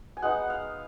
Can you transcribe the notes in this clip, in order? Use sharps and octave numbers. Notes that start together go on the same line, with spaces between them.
G#5
G#3 B3 D#4 F#5
F5